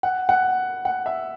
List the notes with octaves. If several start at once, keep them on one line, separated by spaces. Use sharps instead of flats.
F#5
F#5
F#5
E5